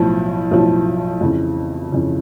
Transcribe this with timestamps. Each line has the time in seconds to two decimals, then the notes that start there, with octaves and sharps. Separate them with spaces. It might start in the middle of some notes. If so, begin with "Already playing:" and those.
Already playing: B1 A2 F3
0.51 B1 A2 F3
1.21 F2 C#3 E3
1.90 F2 C#3 E3